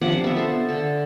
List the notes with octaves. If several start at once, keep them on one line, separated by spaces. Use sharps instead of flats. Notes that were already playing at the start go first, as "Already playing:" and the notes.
C3 F3 D4 F#5
B3 E5
A4 C5
D3 A4